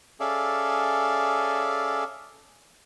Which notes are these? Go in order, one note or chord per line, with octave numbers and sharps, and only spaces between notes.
C#4 G#4 A4 D5 E5 F5